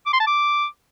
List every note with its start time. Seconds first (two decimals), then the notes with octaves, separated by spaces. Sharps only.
0.06 D6
0.13 C6
0.20 A5
0.27 D6